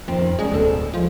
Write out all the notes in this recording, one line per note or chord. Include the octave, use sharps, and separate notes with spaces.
F2 D#3 C4
G3 G#3 C#4 D4
D1 B2 D4 A4
F3 G#3